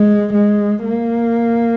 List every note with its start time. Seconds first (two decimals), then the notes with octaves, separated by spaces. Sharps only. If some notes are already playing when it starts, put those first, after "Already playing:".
Already playing: G#3
0.34 G#3
0.85 A#3